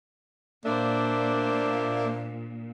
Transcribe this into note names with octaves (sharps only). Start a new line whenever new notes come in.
A#2 A#3 D4 C5 D5 E5